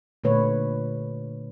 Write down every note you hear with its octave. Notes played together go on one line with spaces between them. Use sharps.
A#2 D3 A3 B4 C#5